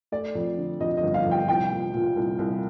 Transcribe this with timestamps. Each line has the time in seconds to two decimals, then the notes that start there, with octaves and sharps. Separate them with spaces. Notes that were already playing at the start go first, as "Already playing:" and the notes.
0.12 A3 D5
0.35 F2
0.58 D3
0.81 F2 D#5
0.97 D#5
1.03 G1
1.14 F5
1.26 F2
1.31 G5
1.48 C2 G5
1.71 A#2
1.93 A#2
2.16 C2
2.39 C2